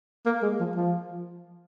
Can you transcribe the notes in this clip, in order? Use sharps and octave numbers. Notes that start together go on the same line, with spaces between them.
A#3
G#3
F3
F3